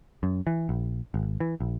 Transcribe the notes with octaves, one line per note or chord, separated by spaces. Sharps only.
F#2
E3
A#1
G#1
E3
A#1